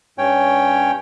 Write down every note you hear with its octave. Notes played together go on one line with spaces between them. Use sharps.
G2 C#4 C#5 G5